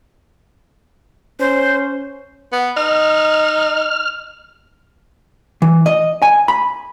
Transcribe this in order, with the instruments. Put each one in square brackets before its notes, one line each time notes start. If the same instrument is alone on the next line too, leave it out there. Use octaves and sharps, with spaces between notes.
[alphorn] C#4 [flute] C5
[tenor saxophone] B3
[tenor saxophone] D#4 [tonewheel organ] F6
[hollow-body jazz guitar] E3
D#5
G#5
B5